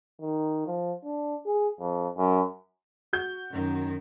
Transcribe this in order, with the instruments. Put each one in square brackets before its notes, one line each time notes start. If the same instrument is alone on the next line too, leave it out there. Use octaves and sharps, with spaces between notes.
[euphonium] D#3
F3
D4
G#4
F2
F#2
[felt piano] F#4 G6
[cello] F#2 D#3